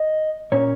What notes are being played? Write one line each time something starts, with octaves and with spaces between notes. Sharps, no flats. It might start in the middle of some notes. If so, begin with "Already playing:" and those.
Already playing: D#5
A#2 A#3 C#4 C#5